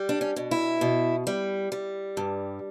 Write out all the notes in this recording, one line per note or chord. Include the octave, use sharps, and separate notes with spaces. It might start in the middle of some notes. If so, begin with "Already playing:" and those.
Already playing: G3
D4
C#4
B2
E4
B2
G3
G3
G2